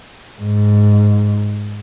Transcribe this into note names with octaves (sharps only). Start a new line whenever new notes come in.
G#2